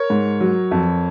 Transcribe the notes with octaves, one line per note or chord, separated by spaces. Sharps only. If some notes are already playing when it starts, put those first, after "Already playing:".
Already playing: A#4 C#5
G#2
F#3
F2